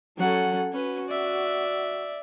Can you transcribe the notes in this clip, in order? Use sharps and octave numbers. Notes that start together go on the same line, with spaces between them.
F#3 C#4 A4 F#5
C#4 F#4 B4
D5 E5